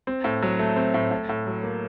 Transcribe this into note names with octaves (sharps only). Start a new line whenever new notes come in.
C4
A2
F#3
A3
C4
A2
A2
A2
F#3
A#3